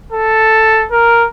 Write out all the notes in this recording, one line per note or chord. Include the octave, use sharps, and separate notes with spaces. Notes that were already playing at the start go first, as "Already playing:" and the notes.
A4
A#4